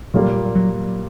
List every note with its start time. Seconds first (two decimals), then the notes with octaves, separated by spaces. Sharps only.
0.14 A#2 F#3 G3 A#3
0.55 F#3